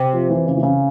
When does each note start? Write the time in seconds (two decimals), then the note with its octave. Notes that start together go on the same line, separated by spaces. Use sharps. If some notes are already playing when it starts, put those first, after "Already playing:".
Already playing: C3
0.13 F3
0.30 E3
0.47 C#3
0.57 E3
0.63 C#3